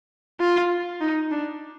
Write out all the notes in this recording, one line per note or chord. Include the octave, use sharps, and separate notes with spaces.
F4
D#4
D4